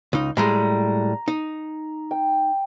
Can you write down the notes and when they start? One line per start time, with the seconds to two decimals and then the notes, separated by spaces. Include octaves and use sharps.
0.13 C#2 D#4
0.37 A2 G3 G#3 A#5
1.28 D#4
2.11 G5